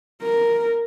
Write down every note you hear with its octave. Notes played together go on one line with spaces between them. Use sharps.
A#4